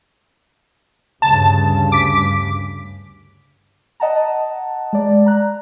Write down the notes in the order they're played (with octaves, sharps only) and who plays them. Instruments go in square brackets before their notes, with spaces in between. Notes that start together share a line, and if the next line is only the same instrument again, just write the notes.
[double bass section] D2 G2 C#3 [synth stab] A5
[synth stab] D6 B6
[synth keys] D#5 F#5 A5 A#5
G#3 D5
A#5 F#6